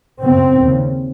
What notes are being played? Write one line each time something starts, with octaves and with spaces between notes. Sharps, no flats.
F#2 C#3 C4
D#2 C#3